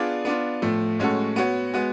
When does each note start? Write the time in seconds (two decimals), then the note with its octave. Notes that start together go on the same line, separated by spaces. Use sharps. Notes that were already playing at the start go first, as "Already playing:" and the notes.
Already playing: B3 D4 F4 G#4 D5
0.25 B3 D4 F4
0.62 A2 F3 A3
0.99 A2 G#3 C#4 F#4 A4
1.36 B3 F#4 C#5
1.74 G#3 B3 F#4